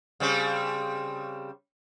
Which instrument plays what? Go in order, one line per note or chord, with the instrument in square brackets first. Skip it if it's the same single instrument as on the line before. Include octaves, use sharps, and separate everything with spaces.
[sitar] C#3 G3 C4